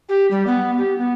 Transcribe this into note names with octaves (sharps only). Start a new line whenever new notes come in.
G4
G3
B3
G4
B3